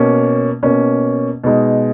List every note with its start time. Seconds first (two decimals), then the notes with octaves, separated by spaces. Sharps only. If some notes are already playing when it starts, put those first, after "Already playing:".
Already playing: B2 A#3 C#4
0.63 B2 A#3 C#4
1.44 B2 G#3 D#4